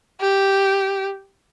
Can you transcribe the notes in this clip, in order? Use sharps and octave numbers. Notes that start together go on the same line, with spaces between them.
G4